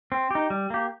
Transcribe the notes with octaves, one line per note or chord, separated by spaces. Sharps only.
C4
D#4 G4
G3
A#3 G4